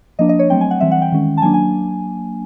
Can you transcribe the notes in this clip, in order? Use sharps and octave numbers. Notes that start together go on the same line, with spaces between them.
F3 A#3 D4 D#5
D#5
C#5
F#3 A3 C4 G5
G#5
F#5
E3 G3 C4 E5
F#5
G5
D#3 G#3 C#4
A5
F#3 A#3 D4 G#5
G#5